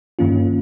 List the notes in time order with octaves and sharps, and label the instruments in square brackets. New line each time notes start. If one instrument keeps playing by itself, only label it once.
[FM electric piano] G2 D#3 A#3 C#4 F4